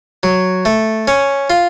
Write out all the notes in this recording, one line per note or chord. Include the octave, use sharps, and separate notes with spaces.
F#3
A3
C#4
F4